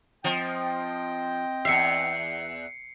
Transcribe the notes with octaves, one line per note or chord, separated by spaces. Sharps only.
F3 C4 D#5 G5
E2 E5 C7 C#7